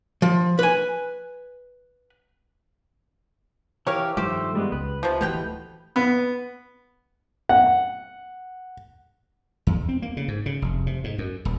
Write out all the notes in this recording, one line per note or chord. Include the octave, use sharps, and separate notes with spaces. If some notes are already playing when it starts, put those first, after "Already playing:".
F3
B4 G#5
E3 G4 A#4 C#5 F5
G2 D#3 F3 A3 G4 C5
G3 G#3 B3
C#2 B4
C3 F3
D1 B2 E3 A3 G4 G5
B3
F#5
E2
C4
A#3
C#3
G#2
C#3
F1
C3
G#2
F#2
D#1